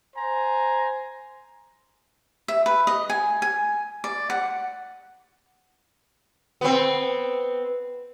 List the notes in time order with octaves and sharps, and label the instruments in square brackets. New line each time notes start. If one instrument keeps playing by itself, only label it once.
[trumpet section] C5 G#5 A#5
[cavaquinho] E5
B4
D#5
G#5
G#5
D5
F#5
[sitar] B3 C4